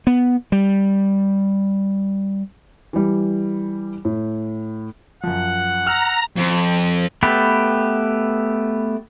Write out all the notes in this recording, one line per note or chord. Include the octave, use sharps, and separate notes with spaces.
B3
G3
E3 G3
A2
F#2 F3 F#5
A#5 E6 F6 F7
F2
A3 B3 G4 B4